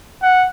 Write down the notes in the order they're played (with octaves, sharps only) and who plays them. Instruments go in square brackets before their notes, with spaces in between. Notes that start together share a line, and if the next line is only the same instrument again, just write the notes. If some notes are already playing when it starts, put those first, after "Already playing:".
[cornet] F#5